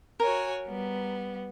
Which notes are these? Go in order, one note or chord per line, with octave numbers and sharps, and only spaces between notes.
F#4 A#4 C#5 G#5
G3 B3